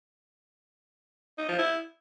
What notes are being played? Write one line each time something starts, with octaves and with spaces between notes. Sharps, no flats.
D#4
F3
E4